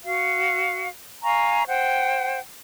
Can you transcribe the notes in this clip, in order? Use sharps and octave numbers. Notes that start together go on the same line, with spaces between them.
F#4 F5
F5 G#5 A#5 C#6
C5 F#5 G5